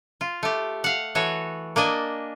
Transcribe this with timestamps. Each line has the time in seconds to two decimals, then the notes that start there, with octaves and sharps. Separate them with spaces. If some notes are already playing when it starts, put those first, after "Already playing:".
0.21 F4
0.43 A3 G4
0.84 F5 F#5
1.15 E3 F#4 A4 C#5
1.76 A#3 D4 D#5 G#5